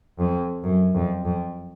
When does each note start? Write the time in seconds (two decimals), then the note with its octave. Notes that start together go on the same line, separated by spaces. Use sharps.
0.19 F2
0.64 F#2
0.94 F2
1.25 F2